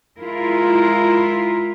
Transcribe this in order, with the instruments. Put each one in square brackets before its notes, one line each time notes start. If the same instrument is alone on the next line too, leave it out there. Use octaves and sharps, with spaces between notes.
[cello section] G#3 E4 F4 A#4